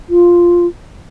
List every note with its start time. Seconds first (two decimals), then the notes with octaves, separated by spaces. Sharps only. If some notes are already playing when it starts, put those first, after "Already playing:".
0.09 F4